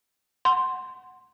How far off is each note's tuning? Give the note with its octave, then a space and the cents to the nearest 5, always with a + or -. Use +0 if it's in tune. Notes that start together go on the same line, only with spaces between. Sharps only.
F#5 +0 C6 +0